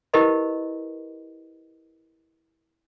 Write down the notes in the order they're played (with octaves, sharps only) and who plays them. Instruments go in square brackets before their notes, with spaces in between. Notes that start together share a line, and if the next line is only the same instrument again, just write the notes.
[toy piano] E4 G4 A#4 B4 D#5 B5